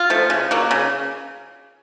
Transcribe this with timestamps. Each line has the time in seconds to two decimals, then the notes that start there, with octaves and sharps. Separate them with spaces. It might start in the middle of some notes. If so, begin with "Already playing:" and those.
Already playing: F4
0.10 F3 A3
0.30 C#3
0.51 F#3 A#3
0.71 C#3